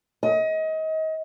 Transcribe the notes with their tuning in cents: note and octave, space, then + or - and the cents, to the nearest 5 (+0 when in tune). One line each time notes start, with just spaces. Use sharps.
D#5 +30